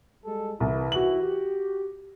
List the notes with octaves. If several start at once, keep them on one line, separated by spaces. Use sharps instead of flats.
G3 G#3 A4
C2 E3 E4
F#4 F#7
G4